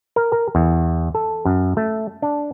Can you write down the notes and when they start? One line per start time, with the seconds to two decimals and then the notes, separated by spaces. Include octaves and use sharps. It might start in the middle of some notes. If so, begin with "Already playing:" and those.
0.16 A#4
0.32 A#4
0.55 E2
1.15 A4
1.45 F#2
1.77 A3
2.22 D4